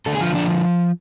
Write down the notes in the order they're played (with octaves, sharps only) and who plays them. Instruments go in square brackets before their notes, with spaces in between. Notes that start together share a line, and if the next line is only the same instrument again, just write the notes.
[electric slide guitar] D3 A3 A4
G#4
F3 F4
F3 D4